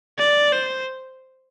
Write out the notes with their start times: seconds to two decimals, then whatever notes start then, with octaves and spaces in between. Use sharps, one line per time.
0.18 D5
0.52 C5